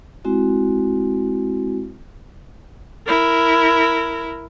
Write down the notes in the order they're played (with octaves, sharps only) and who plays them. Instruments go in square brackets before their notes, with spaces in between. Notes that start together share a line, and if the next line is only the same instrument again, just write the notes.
[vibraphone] G#3 C4 E4 F#4
[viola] E4 A#4